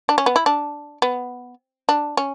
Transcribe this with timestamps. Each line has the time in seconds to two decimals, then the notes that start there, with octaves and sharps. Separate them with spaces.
0.09 D4
0.18 C#4
0.26 B3
0.36 E4
0.46 D4
1.02 B3
1.89 D4
2.17 C#4